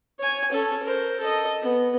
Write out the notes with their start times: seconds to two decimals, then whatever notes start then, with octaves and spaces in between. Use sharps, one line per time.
0.19 C#5 G#5
0.52 C#4 A4
0.83 A#4 C5
1.20 A4 D#5
1.62 B3